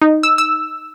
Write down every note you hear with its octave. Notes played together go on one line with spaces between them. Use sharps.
D#4
E6
E6